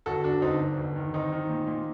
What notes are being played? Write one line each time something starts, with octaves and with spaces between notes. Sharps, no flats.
G1 F#4 A4
G1 D4 F#4
G1 C4 D#4
G1
G1
D#3
D#3 C4 D#4
D#3
A#2
A#2